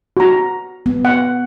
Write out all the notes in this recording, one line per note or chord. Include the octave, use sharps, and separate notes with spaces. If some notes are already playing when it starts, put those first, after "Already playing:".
F#4 A#5
B3
F#5